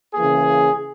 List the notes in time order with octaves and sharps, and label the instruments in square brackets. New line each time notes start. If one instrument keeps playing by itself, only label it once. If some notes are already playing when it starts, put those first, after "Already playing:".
[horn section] C#3 E3 A#3 G#4